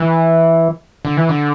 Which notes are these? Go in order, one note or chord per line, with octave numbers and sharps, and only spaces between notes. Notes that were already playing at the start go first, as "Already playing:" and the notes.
Already playing: E3
D3
E3
D3